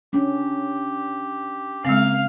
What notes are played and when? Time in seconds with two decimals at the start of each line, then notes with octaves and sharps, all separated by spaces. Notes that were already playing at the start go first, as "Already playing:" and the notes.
0.13 C#4 D4 G4
1.85 C#3 G#3 A#3 C4 F5